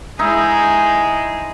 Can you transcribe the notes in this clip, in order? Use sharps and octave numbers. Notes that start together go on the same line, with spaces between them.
G#3 D#4 E4